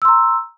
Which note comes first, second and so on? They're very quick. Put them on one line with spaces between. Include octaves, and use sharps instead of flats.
E6 C6 A#5